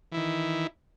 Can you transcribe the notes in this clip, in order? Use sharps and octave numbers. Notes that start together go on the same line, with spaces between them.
D#3 E3 E4